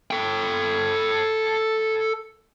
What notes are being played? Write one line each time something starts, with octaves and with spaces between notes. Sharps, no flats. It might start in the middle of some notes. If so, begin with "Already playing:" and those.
A4 G5